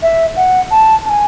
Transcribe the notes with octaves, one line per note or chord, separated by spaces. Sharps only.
E5
F#5
A5
A5
G#5